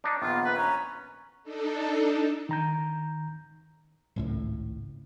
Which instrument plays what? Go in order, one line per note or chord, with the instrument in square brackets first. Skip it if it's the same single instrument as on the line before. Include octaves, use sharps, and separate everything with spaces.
[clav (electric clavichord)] D4 D#4
[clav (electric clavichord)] A#1 D#3 [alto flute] B3 [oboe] F4
[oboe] B4
[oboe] C#4 [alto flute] A#5
[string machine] D4 D#4 A4
[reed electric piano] D#3 A#5 G6
[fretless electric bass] G#1 C#2 A2